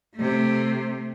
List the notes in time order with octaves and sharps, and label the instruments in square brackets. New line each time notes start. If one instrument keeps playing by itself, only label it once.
[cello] C3 A3